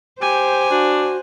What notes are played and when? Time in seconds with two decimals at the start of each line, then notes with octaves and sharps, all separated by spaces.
0.22 G4 C5 G#5
0.70 D4 F#4